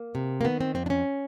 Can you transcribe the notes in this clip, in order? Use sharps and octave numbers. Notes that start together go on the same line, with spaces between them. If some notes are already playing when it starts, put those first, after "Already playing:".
Already playing: A#3
C3
A#3
D#3 B3
C4
F2 C4
D4
C#4